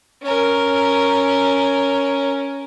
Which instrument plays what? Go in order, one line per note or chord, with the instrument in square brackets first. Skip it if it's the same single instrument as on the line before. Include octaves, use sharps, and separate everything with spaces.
[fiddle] C#4 A#4